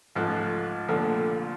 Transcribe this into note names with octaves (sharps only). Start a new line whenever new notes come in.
C#2 G#2 F3 A3 F#6
C2 A#2 D3 F3 A3